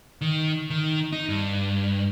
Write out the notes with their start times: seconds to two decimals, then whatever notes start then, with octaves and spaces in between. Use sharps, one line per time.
0.21 D#3
0.70 D#3
1.13 D#4
1.29 G2